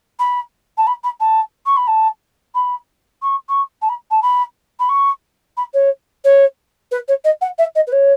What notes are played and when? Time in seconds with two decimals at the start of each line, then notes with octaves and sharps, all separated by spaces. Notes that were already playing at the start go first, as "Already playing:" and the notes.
0.19 B5
0.77 A5
0.87 B5
1.03 B5
1.20 A5
1.65 C#6
1.76 B5
1.87 A5
2.54 B5
3.22 C#6
3.48 C#6
3.82 A5
3.89 B5
4.11 A5
4.22 B5
4.79 B5
4.89 C#6
5.57 B5
5.73 C#5
6.24 C#5
6.91 B4
7.08 C#5
7.24 D#5
7.41 F#5
7.58 E5
7.75 D#5
7.87 B4
7.92 C#5